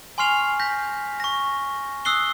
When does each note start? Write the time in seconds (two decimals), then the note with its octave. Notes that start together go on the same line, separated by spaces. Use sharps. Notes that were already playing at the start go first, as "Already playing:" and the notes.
0.18 G#5 C6 C#6 F6 C7 F7
0.60 G6 A#6 B6
1.20 C#6 A#6
2.05 D#6 E6 F#6 C7 G7